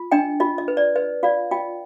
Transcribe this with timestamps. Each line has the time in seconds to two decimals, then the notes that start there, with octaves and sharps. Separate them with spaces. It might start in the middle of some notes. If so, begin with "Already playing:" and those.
Already playing: F4
0.11 D4 D#5 G5
0.40 F4 D#5
0.58 D#5
0.68 B4
0.77 D5
0.96 B4 D#5
1.23 F4 D5 F5
1.51 F4 D#5 G5